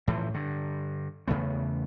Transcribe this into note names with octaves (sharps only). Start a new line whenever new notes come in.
A2 E3 F3
G2 D3
E2 C#3 A3 B3